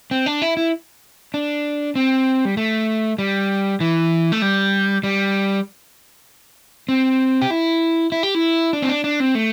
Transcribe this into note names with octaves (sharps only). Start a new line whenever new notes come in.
C4
D4
E4
E4
D4
C4
G3
A3
G3
E3
A3
G3
G3
C4
G4
E4
E4
G4
E4
D4
C4
D4
D4
C4
A3